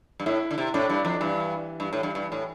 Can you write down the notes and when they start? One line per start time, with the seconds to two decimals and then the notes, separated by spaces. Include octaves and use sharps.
0.20 G2
0.26 A2 E4
0.51 D3
0.58 C3
0.74 A2 D4
0.90 G2
1.05 F2
1.20 G2 E3
1.80 G2
1.93 A2
2.03 G2
2.15 G2
2.32 A2